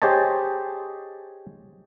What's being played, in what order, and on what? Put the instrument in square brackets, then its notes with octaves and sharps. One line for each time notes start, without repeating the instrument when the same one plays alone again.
[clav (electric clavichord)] G4 G#4 C5 C#5 D#5 A5